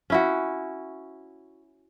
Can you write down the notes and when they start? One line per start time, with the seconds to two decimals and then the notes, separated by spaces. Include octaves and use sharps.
0.10 C#4 E4 F#4